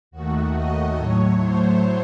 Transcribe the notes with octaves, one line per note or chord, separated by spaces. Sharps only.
D#2 D#3 A3 F#4
D#5
A2 F#3 A3 C#5
C5